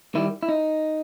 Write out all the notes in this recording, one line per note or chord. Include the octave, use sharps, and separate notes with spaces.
D#3 G3 E4
E4
D#4